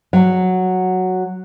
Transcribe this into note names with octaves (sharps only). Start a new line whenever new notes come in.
F#3